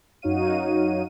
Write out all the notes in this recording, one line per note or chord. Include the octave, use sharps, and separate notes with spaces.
F#2 D#4 F#4 C#5 F5 D#7